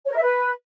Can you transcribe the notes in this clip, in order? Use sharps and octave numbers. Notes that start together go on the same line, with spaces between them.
C#5
A#4
E5
B4